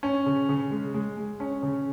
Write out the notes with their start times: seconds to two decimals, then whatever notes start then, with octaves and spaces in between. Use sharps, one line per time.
0.03 C#4
0.26 C#3
0.49 C#3
0.71 G#3
0.94 G#3
1.17 G#3
1.40 C#4
1.63 C#3